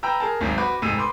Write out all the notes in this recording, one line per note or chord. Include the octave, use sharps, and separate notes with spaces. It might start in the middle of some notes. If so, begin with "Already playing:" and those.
B4 G5 A#5 E6
G#4 A#4 A5
G#1 G#2 F#3
F#4 B4 D6
F1 G#2 E6 D#7
B4 C6 D6